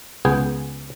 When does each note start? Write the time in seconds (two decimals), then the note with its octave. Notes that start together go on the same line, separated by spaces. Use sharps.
0.25 C#2 B3 G#4 G5 G#5